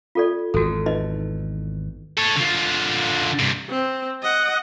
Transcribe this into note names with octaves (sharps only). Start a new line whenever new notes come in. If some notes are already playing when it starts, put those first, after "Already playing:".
F4 A4 D5
G#1 E2 F#4 A4
D#4 B4 D#5
A4 C#5
D3 F4
G2 C3
C4
D#5 F#5